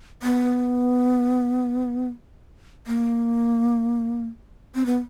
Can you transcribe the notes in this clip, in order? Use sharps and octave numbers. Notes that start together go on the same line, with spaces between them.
B3
A#3
C4
B3